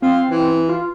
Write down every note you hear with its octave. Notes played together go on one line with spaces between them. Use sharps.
C4 F4
E3
F4